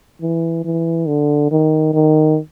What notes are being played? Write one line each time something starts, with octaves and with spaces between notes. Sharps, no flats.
E3
E3
D3
D#3
D#3